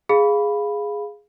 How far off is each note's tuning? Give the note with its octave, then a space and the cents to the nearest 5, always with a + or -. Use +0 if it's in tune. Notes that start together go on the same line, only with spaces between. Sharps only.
G#4 +0 F5 +0 B5 +0